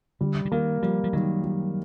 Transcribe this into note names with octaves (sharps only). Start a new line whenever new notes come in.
D3 G3
D3
D#3 A#3
F3 G3
F3
D#3 F#3
G3